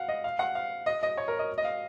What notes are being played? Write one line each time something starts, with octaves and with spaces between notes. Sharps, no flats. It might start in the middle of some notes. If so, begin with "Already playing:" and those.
Already playing: F5 F#5
D#5
F5
F#5
F5
D#5
D#5
C#5
A#4
D#5
D#5
F5